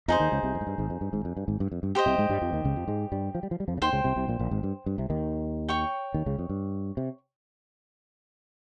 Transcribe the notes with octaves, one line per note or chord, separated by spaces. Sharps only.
F2 F3 D#4 G#4 C5
D#2 D#3
C#2 C#3
C2 C3
F2
G#2
G2
G#1 G#2
F2
G2
G#1 G#2
F2
G2
G#1 G#2
G2
F2
G2
G4 C5 D#5
C2 C3
G#2 G#3
G2 G3
F2 F3
D#2 D#3
C#2 C#3
F2 F3
G#2 G#3
G2 G3
F3
G3
F3
G3
F2 F3
C#3
D#2 D#3 C5 G5 C6
C#2 C#3
C2 C3
C2 C3
A#1 A#2
A#1 A#2
G#1 G#2
G2
G2
C2 C3
D#2 D#3
C#5 G5 C#6
D#2 D#3
C#2 C#3
F2
G2
C3